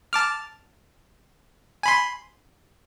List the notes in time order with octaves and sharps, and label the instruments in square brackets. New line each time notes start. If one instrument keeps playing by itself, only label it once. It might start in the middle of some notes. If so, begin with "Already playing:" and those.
[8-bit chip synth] A5 D6 F6
G#5 B5 C6